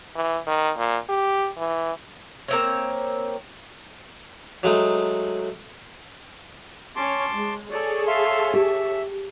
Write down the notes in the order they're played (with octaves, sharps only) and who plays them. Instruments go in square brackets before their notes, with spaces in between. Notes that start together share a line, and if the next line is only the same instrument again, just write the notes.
[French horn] E3
D#3
A#2
G4
E3
[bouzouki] A#3 C4 C#5
[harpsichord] F#3 G#3 A3 D#4
[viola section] C#4 C#5 [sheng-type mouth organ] A5 C6 D6
[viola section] G#3
[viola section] G#4 A4 C#5 [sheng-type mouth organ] D5
[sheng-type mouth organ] E5 F5 C6
[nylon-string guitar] G4 [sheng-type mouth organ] E5